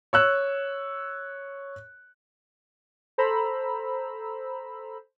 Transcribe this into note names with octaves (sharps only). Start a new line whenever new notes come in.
C#5 E6 F#6
A4 C5 A#5 B5 E6